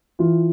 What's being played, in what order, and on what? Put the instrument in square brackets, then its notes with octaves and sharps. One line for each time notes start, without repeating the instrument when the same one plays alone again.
[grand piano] E3 F4